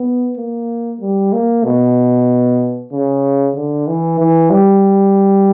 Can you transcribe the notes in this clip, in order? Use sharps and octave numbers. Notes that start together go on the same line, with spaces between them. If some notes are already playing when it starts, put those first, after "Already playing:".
Already playing: B3
A#3
G3
A#3
B2
C#3
D3
E3
E3
G3